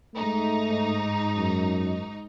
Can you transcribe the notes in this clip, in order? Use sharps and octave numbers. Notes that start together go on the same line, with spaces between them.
G#2 A3 D#4
F#2